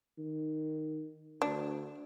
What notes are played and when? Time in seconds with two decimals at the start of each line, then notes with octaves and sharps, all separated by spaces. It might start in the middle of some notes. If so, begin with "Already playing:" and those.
0.18 D#3
1.42 D2 D4